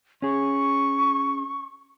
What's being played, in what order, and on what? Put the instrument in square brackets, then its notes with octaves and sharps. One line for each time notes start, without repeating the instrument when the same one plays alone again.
[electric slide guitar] C#4 G#4 [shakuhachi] C#6